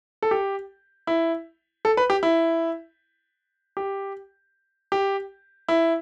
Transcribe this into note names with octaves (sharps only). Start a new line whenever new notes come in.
A4
G4
E4
A4
B4
G4
E4
G4
G4
E4